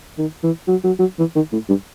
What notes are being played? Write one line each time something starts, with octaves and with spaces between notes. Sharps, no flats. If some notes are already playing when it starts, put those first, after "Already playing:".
D#3
E3
F#3
F#3
F#3
E3
D#3
A2
G2